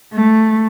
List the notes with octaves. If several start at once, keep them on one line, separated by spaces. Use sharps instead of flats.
A3